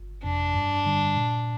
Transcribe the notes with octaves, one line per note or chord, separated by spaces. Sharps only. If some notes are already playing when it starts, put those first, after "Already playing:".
Already playing: G1
F2 C3 D4
G2
D3 G3
A#2